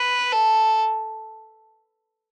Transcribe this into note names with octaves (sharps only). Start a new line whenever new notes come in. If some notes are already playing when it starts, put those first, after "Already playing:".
Already playing: B4
A4